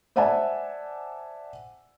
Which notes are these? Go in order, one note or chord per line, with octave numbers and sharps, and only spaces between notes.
C5 D5 E5 F#5 G#5 A5